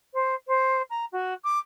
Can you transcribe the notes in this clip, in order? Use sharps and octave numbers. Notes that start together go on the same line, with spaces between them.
C5
C5
A#5
F#4
D6